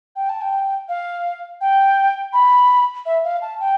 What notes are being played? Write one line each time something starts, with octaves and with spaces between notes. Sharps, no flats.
G5
A5
G5
F5
G5
B5
E5
F5
A5
G5